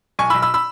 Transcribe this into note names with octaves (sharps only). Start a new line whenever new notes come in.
B1 G#5 C#6
B5 E6
B1
B5 E6
B5 E6